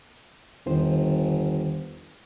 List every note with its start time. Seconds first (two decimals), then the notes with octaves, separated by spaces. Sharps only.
0.66 G1 E2 D#3 C5